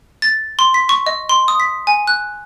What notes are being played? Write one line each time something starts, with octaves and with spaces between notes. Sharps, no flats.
A6
C6
B6
C#6
D#5
C6
D#6
B6
G#5
F#6